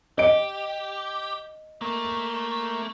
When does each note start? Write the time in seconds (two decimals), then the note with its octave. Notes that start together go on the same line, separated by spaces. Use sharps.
0.18 G4 D#5 D7
1.81 A3 A#3